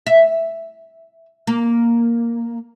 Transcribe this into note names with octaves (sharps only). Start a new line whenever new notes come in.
E5
A#3